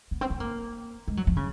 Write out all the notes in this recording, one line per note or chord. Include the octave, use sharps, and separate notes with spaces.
B3
C4
B3
A#3
G#3
F#3
F3
C#3